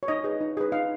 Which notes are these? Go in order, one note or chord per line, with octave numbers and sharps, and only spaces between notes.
C#5
D#4 D#5
G#4 B4
D#4
G#4 B4
D#4 F5